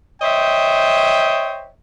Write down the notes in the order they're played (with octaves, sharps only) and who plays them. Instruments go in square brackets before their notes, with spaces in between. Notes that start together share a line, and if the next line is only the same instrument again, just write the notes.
[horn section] C5 C#5 D#5 E5 G5